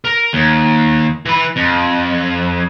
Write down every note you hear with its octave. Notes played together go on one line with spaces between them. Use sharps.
A#4
D#2
E3 B5
F2